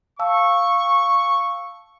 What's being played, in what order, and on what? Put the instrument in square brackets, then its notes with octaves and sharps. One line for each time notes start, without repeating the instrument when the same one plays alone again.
[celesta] F5 A5 E6 [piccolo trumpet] C#6